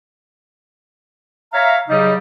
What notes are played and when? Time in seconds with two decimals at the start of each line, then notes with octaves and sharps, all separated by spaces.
1.53 C#5 E5 F5 A#5
1.89 C#3 F#3 G3 D#4